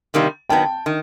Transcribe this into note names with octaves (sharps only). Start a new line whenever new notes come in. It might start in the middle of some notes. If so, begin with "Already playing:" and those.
C3 D#3 G3 A#3
D#3 F#3 B3 G5 A5
D#3